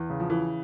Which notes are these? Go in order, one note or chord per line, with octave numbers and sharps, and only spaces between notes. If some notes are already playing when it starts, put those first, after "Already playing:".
Already playing: E2
C#3
F3
E3